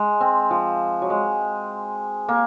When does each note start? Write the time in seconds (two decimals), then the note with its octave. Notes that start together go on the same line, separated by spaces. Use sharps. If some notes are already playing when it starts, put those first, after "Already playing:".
Already playing: G#3
0.21 C4
0.50 F3
1.02 F#3
1.10 G#3
2.29 A#3